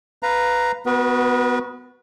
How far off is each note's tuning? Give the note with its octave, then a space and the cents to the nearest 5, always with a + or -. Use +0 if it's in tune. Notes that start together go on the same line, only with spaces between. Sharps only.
B4 +5 F5 +0 A#5 +0
B3 +15 F#4 -5 B4 -40